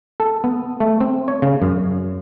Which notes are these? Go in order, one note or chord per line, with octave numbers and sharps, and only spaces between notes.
A4
B3
A3
C4
C#5
C#3
F#2